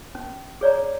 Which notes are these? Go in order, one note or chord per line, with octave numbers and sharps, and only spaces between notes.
C#4
G#4 C#5 D5 A#5